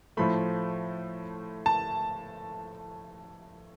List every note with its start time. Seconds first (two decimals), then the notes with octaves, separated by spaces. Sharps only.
0.17 A2 F3 A3 B5
1.66 A5